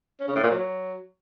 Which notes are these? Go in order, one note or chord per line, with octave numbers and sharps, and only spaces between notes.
C#4
C#3
A2
A#2
F#3